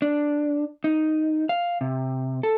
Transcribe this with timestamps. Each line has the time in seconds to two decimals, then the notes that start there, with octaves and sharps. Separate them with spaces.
0.02 D4
0.84 D#4
1.49 F5
1.81 C3
2.43 A4